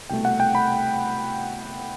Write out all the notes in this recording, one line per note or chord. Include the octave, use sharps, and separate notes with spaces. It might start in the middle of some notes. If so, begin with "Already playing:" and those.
C2 B2 A3 G5
F#5
G5
B5